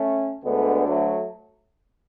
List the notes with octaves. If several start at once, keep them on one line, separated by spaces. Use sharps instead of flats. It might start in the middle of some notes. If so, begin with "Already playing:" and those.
Already playing: A3 C#4
D2 D3 G#3 B3
F#3 A3